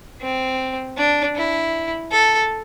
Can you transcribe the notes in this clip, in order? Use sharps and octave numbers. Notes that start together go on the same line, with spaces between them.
C4
D4
E4
A4